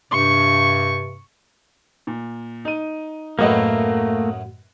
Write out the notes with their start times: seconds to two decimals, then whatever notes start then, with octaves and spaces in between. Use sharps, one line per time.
0.12 G2 C3 C#6
2.07 A#2
2.65 D#4 D#7
3.39 F#2 A2 F#3 A3 A#3 B4 D#5 F#5